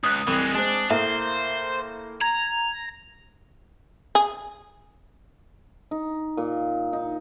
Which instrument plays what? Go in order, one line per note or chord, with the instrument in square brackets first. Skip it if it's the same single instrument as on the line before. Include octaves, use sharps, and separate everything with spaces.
[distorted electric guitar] C#2 [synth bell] D#6 F#6
[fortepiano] C2 [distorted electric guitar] E3 G#3
[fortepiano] G#3 C4 [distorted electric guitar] D4
[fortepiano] A2 A#3 [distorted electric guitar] C5 [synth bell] E5
[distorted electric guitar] A#5 [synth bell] G#6
[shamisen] G#4
[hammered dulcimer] D#4
A#2
D#4